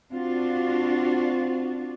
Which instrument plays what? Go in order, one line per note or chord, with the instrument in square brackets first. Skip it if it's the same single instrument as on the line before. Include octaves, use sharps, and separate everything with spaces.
[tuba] C4 [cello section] D4 F4 F#4